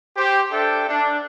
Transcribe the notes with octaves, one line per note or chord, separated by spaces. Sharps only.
G4 C5
D4 A4 E5 G5
D4